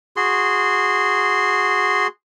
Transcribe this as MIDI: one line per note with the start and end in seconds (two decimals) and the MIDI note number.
0.17 2.07 66
0.17 2.07 68
0.17 2.07 84